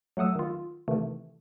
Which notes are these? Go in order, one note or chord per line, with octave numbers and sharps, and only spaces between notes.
F#3 A3 F#5 D#6 E6
D#3 F4
C3 D#3 E3 A3